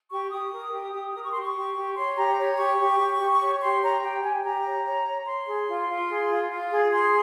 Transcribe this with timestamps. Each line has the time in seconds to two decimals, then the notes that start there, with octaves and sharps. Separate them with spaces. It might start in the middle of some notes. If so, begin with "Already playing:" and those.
0.10 G4 C#6
0.30 G4 D#6
0.51 A#4
0.72 G4
0.93 G4
1.13 A#4 D#6
1.22 C#6
1.31 G4 C6
1.39 C#6
1.54 G4
1.75 G4
1.95 C#5 C6
2.17 G4 A#5
2.36 C#5
2.58 G4 C#6
2.78 G4
2.99 G4
3.19 G4
3.40 C#5
3.60 G4 C6
3.81 C#5 A#5
4.02 G4 G5
4.23 G4 G#5
4.43 G4 A#5
4.63 C#5
4.84 C#5
5.06 C#5
5.25 C#5 C6
5.47 G#4
5.67 F4
5.87 F4
6.08 G#4
6.29 F4
6.50 F4
6.70 G#4
6.91 G#4 C6